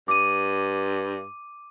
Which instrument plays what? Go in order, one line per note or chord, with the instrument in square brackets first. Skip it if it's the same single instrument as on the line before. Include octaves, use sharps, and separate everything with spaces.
[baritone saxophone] G2 [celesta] D6 D#7